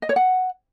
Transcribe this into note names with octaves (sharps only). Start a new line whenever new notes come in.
D#5
C#5
F#5